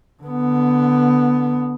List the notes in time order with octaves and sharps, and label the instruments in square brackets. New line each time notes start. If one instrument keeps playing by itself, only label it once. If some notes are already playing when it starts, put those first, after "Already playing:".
[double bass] D3 B3